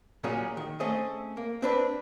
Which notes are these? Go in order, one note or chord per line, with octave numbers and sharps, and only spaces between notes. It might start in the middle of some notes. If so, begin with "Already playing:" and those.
A#2 F#3 G3 C#4 G4 G#4
D#3
A3 C4 C#4 G#4 D#5
A#3
C4 D4 B4